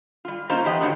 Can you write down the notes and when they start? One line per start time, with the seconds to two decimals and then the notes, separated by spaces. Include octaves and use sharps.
0.25 G3 F4
0.49 A#3 C#4 D#4 F4 C5 A#5
0.65 E3 G4 D#5 F#5
0.81 A2 D3 D#3 F#3